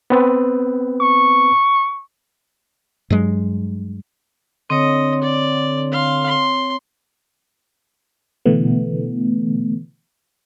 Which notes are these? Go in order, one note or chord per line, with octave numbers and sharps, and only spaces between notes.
B3 C4 B4
C#6
G2 F#3 G#3
D3 C4 C#5 D#5
D5
F5 C6
C6
B2 D3 E3 A3 B3